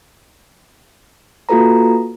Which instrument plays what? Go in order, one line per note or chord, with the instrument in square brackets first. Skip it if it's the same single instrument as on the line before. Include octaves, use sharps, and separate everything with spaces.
[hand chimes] A#3 F4 F#4 A4 B4 A#5